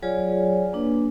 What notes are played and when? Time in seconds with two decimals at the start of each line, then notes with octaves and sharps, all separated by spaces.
0.03 F#3 F4 G#4 C#5 D5 G#5
0.73 A#3 D4 B4